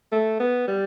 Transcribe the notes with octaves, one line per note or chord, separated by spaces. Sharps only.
A3
B3
G3